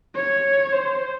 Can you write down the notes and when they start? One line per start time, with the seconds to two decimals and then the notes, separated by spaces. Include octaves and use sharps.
0.15 C#5
0.73 C5